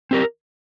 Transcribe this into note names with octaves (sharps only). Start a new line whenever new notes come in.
C4 G4 A#4